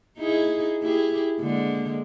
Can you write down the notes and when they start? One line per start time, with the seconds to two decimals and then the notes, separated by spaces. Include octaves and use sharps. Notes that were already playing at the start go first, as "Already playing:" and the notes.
0.18 D#4 E4 G#4
0.82 E4 G4 G#4
1.41 D3 G#3 A#3